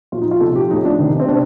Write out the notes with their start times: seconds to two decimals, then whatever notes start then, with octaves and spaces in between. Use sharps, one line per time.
0.12 A#2 F3 F4
0.21 D#4
0.31 F4
0.40 C3 F3 A4
0.56 G4
0.70 A2 F3 D#4
0.85 D4
0.99 C3 D#3
1.20 C4
1.28 C3 D4